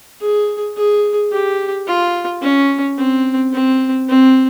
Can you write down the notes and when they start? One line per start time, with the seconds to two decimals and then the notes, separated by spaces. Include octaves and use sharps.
0.21 G#4
0.77 G#4
1.32 G4
1.88 F4
2.42 C#4
2.97 C4
3.52 C4
4.09 C4